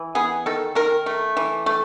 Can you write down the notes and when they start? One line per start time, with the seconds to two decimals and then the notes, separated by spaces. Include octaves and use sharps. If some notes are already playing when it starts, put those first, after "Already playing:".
Already playing: E3
0.15 B3 G#4
0.46 D#3 A4
0.75 D#3 A#4
1.06 A3
1.37 E3
1.66 A3